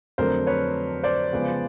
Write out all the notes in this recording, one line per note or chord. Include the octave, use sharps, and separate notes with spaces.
F2 D3 F#3 A3 D4 A#4 C5
B4 C#5
C5 D5
C#3 F3 G#3 B3